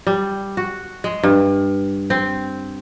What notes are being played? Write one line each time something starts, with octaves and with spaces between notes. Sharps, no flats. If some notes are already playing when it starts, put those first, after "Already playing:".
G3
F#4
G#3
G2
C4